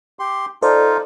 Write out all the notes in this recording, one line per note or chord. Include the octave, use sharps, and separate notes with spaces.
G4 C6
D#4 F4 A4 C5 D5